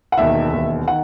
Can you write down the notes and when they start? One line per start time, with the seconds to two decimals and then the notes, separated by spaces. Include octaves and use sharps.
0.12 F#5
0.18 E1 D#2 D#3 E5
0.52 E1 D#2 D#3
0.88 D#3 F#5